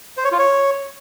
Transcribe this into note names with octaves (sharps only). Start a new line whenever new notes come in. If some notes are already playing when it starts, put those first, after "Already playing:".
C5
C#5
F4
C#5